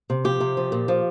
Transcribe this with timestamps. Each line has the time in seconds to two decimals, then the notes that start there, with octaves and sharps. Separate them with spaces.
0.10 C3
0.24 F3 G4
0.40 C3
0.57 F3
0.72 A#2
0.88 F3